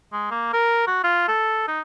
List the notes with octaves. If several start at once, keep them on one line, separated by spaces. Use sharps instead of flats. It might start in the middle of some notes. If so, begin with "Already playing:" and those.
G#3
A#3
A#4
F#4
F4
A4
D#4